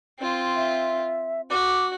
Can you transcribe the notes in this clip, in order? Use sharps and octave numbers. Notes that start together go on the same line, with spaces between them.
C4 F4
E5
F#4 D6